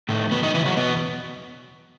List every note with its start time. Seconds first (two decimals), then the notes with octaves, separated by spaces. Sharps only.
0.09 A2 D#3 A3
0.31 F#2 B2 B3
0.43 D#3 D#4
0.54 C#3 E3 E4
0.66 F#3 F#4
0.77 E2 B2 B3